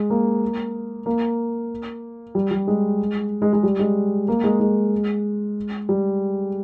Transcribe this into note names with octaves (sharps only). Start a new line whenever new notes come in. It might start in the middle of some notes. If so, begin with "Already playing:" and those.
Already playing: G#3
A#3
A#3
G3
G3
G#3
G#3
G#3
G3
G#3
A#3
G#3
G#3
G3